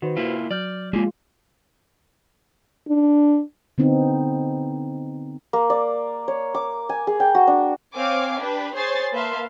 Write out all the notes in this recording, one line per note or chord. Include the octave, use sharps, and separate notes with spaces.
D#3 F#4 B4 C5
A#3 E4 F4
F#3 D5 F6 G6
G#3 A#3 F4 G4 G#4
D4
D3 B3 C4 D#4
A#3
D5
C#5
D6
G#5
G#4
G5
F#4
D4
C4 C#5 F5 G#5 D6
D4 G4 B4
G#4 C5 C#5 G#5 A6 C7
A#3 B4 E5 F5 A5 C6